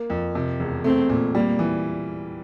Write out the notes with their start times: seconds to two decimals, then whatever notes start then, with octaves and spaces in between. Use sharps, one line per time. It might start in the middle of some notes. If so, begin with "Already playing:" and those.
Already playing: A#3
0.10 F2
0.35 C3
0.60 E1
0.84 A3 C4
1.09 A#2
1.35 G3 A#3
1.59 E3